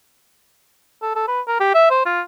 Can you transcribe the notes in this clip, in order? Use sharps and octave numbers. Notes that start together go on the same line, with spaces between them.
A4
A4
B4
A#4
G4
E5
C5
F4